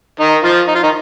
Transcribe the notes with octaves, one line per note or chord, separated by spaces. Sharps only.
D#3 D#4
F3 F4
D#4
F4
D#3 D#4